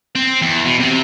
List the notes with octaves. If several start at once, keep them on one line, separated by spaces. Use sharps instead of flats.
C4
E2
B2
C3